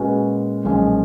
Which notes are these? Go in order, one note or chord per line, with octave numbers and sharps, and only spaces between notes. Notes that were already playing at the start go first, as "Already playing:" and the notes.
Already playing: A#2 G#3 C#4 F#4 B4
B1 A#2 F3 G#3 C#4